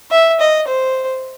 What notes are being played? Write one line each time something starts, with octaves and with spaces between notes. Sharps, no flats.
E5
D#5
C5